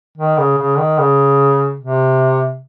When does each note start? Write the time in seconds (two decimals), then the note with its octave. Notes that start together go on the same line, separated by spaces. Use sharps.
0.18 D#3
0.38 C#3
0.59 C#3
0.78 D#3
0.99 C#3
1.80 C3